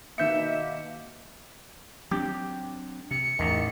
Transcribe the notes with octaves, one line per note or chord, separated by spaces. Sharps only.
B2 D#3 A#3 E5 G6 C#7
F#3 C4 D4 G4
C3 C#7
A1 E2 D#3